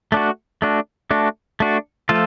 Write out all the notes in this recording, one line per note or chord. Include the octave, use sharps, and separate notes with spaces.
A3 D4 F#4
A3 D4 F#4
A3 D4 F#4
A3 D4 F#4
F3 A3 F4 A4